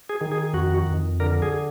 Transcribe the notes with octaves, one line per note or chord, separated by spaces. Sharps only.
G#4
D#3
G#4
F2 F#4
F2
D3 A#4
G#4